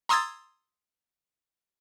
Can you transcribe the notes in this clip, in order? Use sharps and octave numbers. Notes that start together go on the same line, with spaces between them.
A#5 C6 D#6 E6 G#6 A6